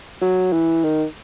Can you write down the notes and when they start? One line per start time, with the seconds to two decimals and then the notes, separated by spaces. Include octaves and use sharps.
0.21 F#3
0.52 E3
0.84 D#3